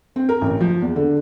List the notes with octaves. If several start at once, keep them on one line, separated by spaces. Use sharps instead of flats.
C4
A#4
A1
F3
E2
D3